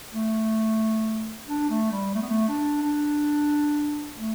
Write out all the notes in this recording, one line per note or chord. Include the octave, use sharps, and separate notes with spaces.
A3
D4
A3
G3
A3
B3
A3
D4
D4
A3